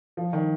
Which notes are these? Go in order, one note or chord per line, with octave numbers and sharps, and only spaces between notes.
F3
D#3